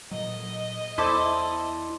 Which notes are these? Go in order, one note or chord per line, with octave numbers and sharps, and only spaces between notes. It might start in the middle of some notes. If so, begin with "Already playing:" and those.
A#2 F#3 D#5
E2 E4 A4 C5 D5